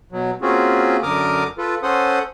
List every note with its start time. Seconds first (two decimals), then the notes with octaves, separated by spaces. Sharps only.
0.12 B2 F#3
0.42 A#3 C4 C#4 F4 F#4 G#4
1.03 F#2 D3 A#4 D6 D#6 F6
1.58 F4 A4 B4
1.83 C#4 A4 C5 F#5 C6 D#6